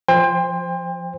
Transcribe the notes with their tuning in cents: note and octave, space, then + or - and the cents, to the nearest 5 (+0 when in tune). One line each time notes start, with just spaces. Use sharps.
F3 +0 C5 +0 G5 +35